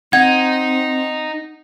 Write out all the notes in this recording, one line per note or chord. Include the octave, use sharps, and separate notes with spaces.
C4 D#4 F#5 G#6